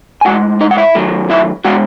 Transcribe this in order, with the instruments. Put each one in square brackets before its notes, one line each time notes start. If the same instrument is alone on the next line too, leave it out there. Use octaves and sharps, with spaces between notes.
[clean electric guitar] G#5
A2 G#3 F#4 F#5
D#4 D#5
F#5
E4 E5
D#3 F#3 A3
E4 E5
B2 G#3 F#4 F#5